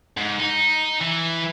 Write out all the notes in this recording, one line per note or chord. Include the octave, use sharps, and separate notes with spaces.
G#2
D#4
E3